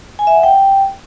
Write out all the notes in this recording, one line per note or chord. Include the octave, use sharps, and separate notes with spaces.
G#5
E5
F#5
G5